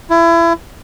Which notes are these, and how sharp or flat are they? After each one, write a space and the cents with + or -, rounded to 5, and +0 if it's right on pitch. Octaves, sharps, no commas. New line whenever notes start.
E4 +30